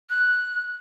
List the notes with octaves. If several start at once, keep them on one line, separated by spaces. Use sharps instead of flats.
F#6